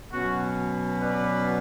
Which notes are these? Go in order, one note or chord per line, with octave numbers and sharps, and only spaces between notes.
B2 F#3 C#4 F#4
B4 D5